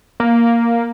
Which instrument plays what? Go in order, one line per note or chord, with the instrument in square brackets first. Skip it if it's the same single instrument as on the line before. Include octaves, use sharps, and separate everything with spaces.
[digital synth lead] A#3